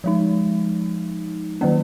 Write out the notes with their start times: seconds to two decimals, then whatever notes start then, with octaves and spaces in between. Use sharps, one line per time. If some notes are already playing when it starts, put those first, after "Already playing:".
0.04 F3 G#3 D#4
1.61 D#3 F#3 A#3 C#4